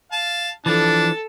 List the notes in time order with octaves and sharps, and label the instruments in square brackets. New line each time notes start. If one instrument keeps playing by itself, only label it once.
[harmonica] F5 A5
[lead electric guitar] E3 F3 [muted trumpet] D4 [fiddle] A4 [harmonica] A5